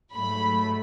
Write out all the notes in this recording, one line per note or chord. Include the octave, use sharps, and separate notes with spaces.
G#2 F#3 A3 B5